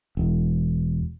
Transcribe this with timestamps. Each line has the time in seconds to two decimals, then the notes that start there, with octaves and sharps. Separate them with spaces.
0.17 E1